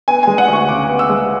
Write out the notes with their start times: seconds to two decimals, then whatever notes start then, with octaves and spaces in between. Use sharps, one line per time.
0.08 B3 G#5
0.23 G#5
0.27 G#3
0.38 F#5
0.48 D2 C#6
0.69 C#3 D6
0.89 B3
0.99 E6
1.10 G#3